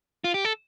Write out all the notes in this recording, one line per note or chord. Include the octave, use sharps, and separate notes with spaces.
F4
G4
A4